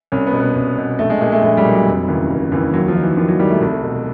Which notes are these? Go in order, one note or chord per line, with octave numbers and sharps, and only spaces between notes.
C2 C#4
B3
B2
B3
C2
B2
A#1 A3
G#3
A#2 G#3
A3
A#1 A3
G3
A#2
F#3
F1
D#2 C#3 E3
F1
D#2 C#3 E3
D#2 F#3
F3
D#3
E3
D#2 F3
F#3
D#3 G3
A3
C2
B2